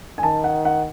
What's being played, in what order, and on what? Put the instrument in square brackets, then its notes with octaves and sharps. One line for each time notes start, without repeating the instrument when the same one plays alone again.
[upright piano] G#5
[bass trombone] D#3 [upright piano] A5
[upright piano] F#5
F#5